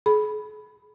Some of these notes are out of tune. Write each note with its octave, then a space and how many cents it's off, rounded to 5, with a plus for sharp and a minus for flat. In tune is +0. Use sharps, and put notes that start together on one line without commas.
G#4 +40 B5 +0